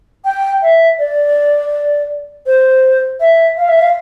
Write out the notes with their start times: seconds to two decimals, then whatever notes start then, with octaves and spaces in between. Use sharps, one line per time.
0.24 G5
0.62 E5
0.99 D5
2.46 C5
3.20 E5
3.57 F5
3.68 E5
3.79 F5